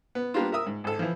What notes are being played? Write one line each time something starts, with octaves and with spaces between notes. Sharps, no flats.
B3
G3 A#3 B3 D4 F4
A#4 E5 D#6 E6
G#2
G#1 A4
E3 F3